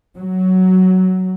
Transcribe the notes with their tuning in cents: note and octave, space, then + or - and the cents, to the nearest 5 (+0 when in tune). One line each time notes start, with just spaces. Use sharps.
F#3 +10